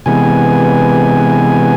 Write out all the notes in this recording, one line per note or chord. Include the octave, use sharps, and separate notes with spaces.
C3 E3 G#3 B3 G#5